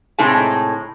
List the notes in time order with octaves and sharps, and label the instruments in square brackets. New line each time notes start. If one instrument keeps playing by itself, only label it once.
[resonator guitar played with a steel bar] A2 C3 G#3 D#4 A5